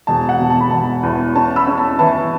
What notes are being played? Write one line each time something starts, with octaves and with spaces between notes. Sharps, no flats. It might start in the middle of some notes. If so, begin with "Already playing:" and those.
E1 A5
F#5
B2
A5
B5
E1 A5
E2
C#4 A5
B5 E6
C#4
A5
E3 A5